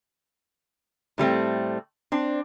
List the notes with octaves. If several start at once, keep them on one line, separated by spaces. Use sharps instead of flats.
A2 G3 A3 C4
C4 D4